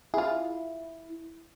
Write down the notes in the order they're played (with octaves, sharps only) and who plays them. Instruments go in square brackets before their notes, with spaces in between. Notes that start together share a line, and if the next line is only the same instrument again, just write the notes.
[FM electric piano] E4 [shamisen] F4 G#4